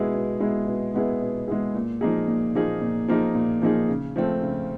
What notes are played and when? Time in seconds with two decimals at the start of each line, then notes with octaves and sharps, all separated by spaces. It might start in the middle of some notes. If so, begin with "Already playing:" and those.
Already playing: B2 G#3 B3 E4 G#4
0.14 B2
0.40 G#3 B3 E4 G#4
0.67 B2
0.94 G#3 B3 E4 G#4
1.21 B2
1.48 G#3 B3 E4 G#4
1.75 A#2
2.01 F3 A#3 D#4 G#4
2.28 A#2
2.55 F3 A#3 D#4 G#4
2.82 A#2
3.08 F3 A#3 D#4 G#4
3.35 A#2
3.62 F3 A#3 D#4 G#4
3.89 C#3
4.16 F3 A3 C4
4.42 C#3